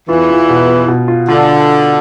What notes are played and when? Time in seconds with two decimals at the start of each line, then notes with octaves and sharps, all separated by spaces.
0.08 E2 E3 F4
0.29 F4
0.49 B2
0.69 F4
0.88 B2
1.08 F4
1.29 D3 F4